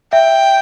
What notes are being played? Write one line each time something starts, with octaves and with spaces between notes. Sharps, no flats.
E5 G5